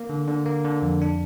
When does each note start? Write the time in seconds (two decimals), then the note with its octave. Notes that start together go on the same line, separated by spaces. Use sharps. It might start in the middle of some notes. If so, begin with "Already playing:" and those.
Already playing: A#3
0.09 D3
0.28 D3
0.46 A#3
0.65 D3
0.82 F2
1.02 D4